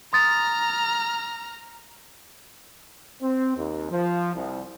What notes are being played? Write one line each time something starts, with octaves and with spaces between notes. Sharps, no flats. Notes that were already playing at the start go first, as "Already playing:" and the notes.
A#5 C6 D#6 F6 A6
C4
D#2
F3
C2